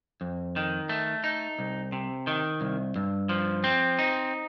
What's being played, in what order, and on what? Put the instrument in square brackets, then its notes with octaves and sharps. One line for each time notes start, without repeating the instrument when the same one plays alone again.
[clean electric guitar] F2
D#3
A3
D#4
C2
C3
D#3
C2
G2
F3
C4
D#4